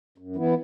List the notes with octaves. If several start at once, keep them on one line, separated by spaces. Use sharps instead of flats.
F#2
E3 B3 E4